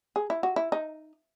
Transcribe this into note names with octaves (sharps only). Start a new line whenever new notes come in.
G#4
E4
F#4
E4
D#4